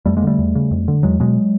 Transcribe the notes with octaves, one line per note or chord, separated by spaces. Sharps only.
F2 G3 A3
G#3 A#3
D3 G3 A3
E2
C#3
F2
D3
E2 F#3 G#3
B2 F#3 G#3